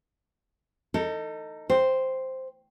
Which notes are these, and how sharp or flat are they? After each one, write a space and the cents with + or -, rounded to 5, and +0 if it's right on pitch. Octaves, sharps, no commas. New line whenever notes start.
D#4 +0 A4 +30
C5 +0 G5 +0